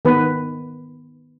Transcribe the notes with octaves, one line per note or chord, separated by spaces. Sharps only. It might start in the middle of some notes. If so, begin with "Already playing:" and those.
D#3 B3 B4